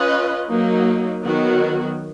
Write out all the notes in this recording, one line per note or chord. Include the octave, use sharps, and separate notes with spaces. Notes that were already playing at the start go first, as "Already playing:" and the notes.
Already playing: C#4 F4 B4 D#5
F#3 A#3 D#4
D#3 F#3 B3 F#4